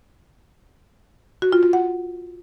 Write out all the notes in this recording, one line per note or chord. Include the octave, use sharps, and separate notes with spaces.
F#4
F4
F4
F#5